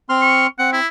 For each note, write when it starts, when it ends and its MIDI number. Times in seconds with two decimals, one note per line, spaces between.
0.09 0.47 60
0.09 0.47 84
0.09 0.47 89
0.22 0.46 85
0.59 0.80 60
0.59 0.70 78
0.73 0.88 64